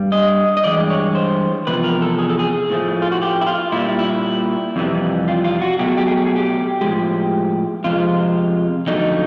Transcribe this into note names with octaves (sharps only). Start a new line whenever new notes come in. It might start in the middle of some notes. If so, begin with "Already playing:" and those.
Already playing: G2 G3
D#5
D#5
G2 E3 G#3 D5
C#5
C5
E2 C3 F3 B4
A#4
A4
G#4
A4
G#4
A2 F3 A3
F4
F#4
G4
E4
F4
A#2 G3 E4
E4
F2 C3 E3 G3
F4
F4
F#4
B2 F#3 A3 G4
G#4
G4
G#4
G4
G#4
G4
A2 F3 G#3 G4
F2 C3 F3 G#3 F4
F2 D3 F#3 A3 D#4